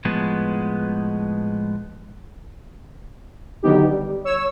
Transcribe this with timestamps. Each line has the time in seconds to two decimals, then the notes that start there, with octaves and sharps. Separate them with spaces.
0.05 A2 F3 G#3 B3
3.63 D3 D#3 F#3 B3 D#4 G4
3.89 G3
4.24 C#5 E6